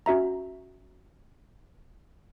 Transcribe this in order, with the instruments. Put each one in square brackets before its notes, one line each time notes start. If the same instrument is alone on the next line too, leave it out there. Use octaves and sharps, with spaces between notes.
[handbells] C#4 F#4 E5 A#5